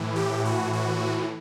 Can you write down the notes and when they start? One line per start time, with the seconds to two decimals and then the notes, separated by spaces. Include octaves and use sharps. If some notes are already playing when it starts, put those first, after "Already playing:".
Already playing: A2 E3
0.16 G4
0.45 F#4
0.73 F#4